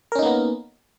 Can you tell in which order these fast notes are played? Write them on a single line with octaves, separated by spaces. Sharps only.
A#4 C#4 D#4 A#3 B3